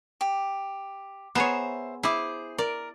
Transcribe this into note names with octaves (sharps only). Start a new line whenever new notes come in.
G4
B3 G#4 C5 C#5 E5 A#5
E4 G#4 C5 D6
A#4 D5